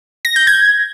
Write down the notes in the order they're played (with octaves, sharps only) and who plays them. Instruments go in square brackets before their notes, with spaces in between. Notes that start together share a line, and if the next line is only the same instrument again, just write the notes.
[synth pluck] A#6
G6
G#6